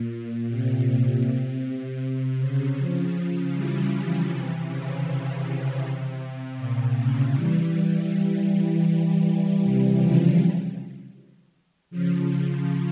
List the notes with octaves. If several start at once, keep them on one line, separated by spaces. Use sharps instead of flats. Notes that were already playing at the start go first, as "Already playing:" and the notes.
Already playing: A#2
A#2
C3
C3
C#3
C#3 F3
E3 G3
E3 G3
C3 E3
C#3
C3
A#2
C#3
E3 G3
C3 E3
C#3 F3
C#3 F3
C#3